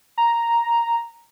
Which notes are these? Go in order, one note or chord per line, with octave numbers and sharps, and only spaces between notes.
A#5